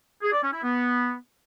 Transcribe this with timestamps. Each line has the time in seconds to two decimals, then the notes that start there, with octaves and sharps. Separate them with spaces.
0.22 G#4
0.32 D5
0.42 C#4
0.52 E4
0.62 B3